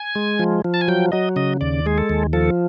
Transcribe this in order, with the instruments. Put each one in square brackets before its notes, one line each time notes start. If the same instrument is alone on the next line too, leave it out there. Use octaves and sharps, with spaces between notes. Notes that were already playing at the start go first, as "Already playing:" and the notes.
Already playing: [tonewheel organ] G#5
G#3
F3
F3
A5
G#5
F#3 G5
F#3 D#5
C#3 D#5
D#2 D5
G#3 G#4
A4
D#2
F3 A4